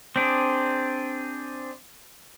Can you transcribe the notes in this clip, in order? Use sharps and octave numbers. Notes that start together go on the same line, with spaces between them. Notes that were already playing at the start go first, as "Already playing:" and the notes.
C4 D4 G#4